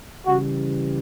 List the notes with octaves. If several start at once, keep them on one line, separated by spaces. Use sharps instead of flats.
C#3 E3 G3 F#4